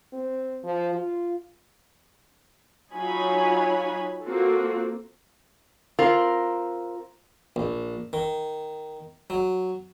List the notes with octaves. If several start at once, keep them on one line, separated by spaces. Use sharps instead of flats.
C4
F3
F4
F#3 D#4 F4 C#5 G#5 B5
A#3 C4 F4 F#4 A4
C4 F4 A#4
A#1
D#3
F#3